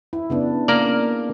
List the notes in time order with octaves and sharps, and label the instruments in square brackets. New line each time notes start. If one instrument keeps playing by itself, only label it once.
[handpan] E4
C#3 B3 D4
[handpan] C#3 [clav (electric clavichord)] A#3 A#4 D5